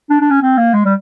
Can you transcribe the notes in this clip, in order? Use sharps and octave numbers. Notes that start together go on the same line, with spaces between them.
D4
D4
C#4
C4
A#3
G#3
G3